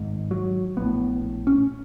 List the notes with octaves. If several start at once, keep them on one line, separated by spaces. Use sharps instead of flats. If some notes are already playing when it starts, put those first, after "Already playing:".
Already playing: G#1 G#2
F#3
A#1 A2 B3
C#4